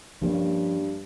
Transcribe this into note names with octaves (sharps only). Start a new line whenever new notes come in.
G2 F3 A#3 C#4